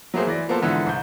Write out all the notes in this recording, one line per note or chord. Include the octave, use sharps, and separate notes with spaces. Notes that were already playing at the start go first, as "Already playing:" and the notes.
F#3 A3 A#3 G#4 C5
E3 D5 A#6
F3 A#3 B3 A4 C5
G#2 D3 E3 F3
C2 G6